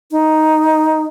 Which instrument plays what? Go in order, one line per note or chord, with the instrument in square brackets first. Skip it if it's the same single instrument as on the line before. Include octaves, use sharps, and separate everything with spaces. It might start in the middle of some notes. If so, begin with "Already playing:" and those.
[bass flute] D#4